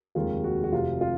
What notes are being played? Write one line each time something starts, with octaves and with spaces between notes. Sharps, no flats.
F1 D#2 D#3 G#3 F4
F#4
F#4
F1 F2 C3 F4
F4